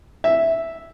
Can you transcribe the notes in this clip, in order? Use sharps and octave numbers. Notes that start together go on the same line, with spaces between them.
E5